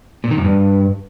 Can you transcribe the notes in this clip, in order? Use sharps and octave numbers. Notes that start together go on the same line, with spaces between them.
A#2
D#3
F#2
G2